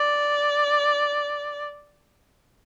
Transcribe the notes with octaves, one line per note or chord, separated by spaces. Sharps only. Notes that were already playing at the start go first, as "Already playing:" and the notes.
Already playing: D5